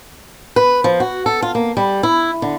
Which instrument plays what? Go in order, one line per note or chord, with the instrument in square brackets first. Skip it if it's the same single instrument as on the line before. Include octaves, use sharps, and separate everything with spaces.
[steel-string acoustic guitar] B4
F3
F#4
A4
F4
A#3
G3
E4
D3